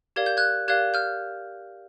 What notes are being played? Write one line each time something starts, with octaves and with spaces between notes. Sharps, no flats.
G4 A#4 D5 F5 G#6
G6
F#6 G#6
G4 A#4 D5 F5 F#6 G#6
F6 G6